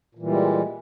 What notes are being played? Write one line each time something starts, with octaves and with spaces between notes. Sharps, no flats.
A#2 E3 G3 G#3